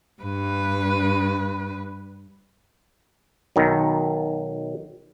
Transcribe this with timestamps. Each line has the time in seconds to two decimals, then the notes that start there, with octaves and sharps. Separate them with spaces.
0.22 G2 B4
3.56 B1 D#3 F#3